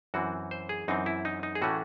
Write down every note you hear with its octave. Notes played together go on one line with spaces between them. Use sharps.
F#2 E3 C4 F#4
C5
G#4
F#2 E3 C4 D#4
E4
D#4
D#4
G#4
A2 E3 A3 C#4 F#4